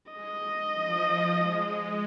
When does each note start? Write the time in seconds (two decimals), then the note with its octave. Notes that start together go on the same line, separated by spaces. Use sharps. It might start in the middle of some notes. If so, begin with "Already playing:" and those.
0.12 G#3 D#5
0.74 F3
1.37 G#3